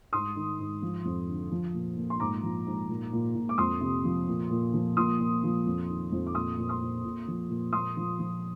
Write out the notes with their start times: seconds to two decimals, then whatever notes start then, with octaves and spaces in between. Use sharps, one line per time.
0.13 G#2 C6 D#6
0.36 D#3
0.59 G#2
0.82 F3
1.05 F2
1.28 D3
1.51 F3
1.74 A#2
1.97 A#2
2.10 C6
2.20 G#2 A#5 D6
2.43 F3
2.66 G#2
2.89 A#2
3.13 A#2
3.35 A#2
3.49 D6
3.58 F2 C6 D#6
3.81 C3
4.04 F3
4.28 A#2
4.50 A#2
4.74 F3
4.97 A#2 C6 D#6
5.20 A#2
5.43 F3
5.66 F2
5.89 D#3
6.12 F2
6.27 D6
6.34 A#2 C6 D#6
6.58 A#2
6.69 C6 D#6
6.81 A#2
7.04 A#2
7.28 F3
7.50 A#2
7.73 A#2 C6 D#6
7.97 F3
8.19 F3